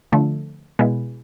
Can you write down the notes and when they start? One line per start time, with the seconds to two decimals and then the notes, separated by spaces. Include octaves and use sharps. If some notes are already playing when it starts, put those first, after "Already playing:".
0.12 D3 F3 A3
0.79 B2 G#3 B3 E4